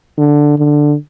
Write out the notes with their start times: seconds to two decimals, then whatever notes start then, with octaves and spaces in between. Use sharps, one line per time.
0.18 D3
0.58 D3